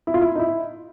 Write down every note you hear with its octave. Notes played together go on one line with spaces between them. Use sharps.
E4
F4
E4
D#4
E4